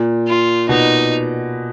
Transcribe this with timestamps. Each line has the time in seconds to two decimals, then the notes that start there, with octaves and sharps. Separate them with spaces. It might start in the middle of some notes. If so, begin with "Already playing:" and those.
Already playing: A#2
0.28 F4
0.69 B2 D#4